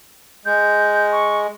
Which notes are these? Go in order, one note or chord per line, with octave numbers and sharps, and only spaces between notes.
G#3 G6
C#6